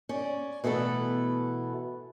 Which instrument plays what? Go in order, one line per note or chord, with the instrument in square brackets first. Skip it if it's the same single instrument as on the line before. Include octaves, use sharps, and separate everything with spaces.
[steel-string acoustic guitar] C#4 D5
B2 E3 A3 B3 A4